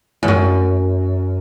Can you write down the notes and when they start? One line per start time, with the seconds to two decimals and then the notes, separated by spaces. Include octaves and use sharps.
0.23 E2
0.28 F#2